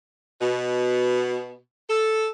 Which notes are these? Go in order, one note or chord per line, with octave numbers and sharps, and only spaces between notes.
B2
A4